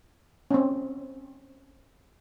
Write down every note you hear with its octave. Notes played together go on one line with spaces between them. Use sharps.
C4 C#4